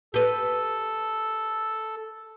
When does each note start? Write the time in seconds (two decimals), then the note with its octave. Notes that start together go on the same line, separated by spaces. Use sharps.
0.14 G4 A4 B4